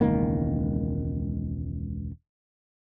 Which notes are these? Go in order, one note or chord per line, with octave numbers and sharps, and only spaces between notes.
E1 C#2 D#3 A#3